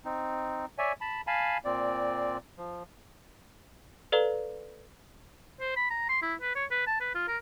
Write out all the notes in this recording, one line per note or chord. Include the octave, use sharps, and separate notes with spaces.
C4 D#4
C#5 D5 E5 G#5
A5 B5
F5 G#5 A5 B5
A#2 C4 D5
F3
A4 B4 D5 F5 A#5
C5
B5
A#5
C6
E4
B4
C#5
B4
A5
B4
F4
A#4